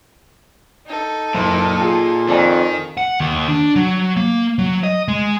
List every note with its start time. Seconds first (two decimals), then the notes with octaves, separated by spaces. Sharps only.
0.87 D#4 A4
1.34 F#1 A#2
1.79 F4 G#4
2.29 F2 D#3 D5 G#5
2.97 F#5
3.20 D#2
3.48 D4
3.76 F#3
4.17 A#3
4.58 F#3
4.83 D#5
5.08 G#3